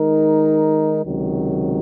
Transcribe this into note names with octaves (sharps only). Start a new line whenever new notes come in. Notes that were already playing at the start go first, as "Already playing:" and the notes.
Already playing: D#3 G#3 D#4 A#4
C#2 C3 D#3 F#3